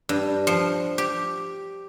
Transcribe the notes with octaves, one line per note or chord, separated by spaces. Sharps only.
G2
F3
G4